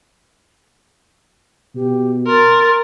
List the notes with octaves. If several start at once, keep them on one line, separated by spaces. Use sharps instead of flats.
B2 G4
A#4 C6 A6